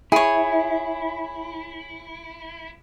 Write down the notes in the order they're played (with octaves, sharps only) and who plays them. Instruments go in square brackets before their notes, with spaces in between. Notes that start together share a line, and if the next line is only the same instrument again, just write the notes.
[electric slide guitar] E4 [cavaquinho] G#4 C#5